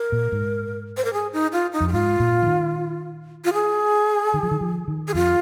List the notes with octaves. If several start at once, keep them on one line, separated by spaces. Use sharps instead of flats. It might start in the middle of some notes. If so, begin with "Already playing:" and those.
Already playing: A#4
A#2
G#2
C5
A#4
G#4
D#4
F4
D#4
F2
G#4
G#2 F4
A#2
F3
D#3
F4
G#4
D#3
F3
D#3
F3
D#3
G#4
F2 F4